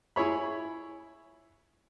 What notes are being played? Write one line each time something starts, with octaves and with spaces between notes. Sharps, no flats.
E4 G#4 C#5 B5